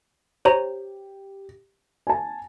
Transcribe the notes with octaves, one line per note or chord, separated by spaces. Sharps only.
G4 C5 C#5 A#5
G#5 A5